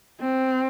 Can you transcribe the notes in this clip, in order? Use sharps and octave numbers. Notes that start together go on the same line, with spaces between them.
C4